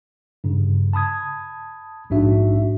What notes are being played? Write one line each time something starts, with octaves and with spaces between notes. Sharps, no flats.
G2 C#3
A5 B5 D#6 G#6
A#1 G#2 D4 F#4 E5